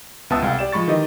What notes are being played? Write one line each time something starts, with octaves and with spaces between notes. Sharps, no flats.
C#2 B3 E5 A5 D#6 E6
C2 G#3 F5 G5
G4 D5 G5 E7
F3 G#3 B5 C#6 A6
D#3 E3 G4 D#5